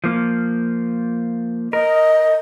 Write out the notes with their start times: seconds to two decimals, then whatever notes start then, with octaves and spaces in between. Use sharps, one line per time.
0.04 F3 A#3
1.73 A#4 D#5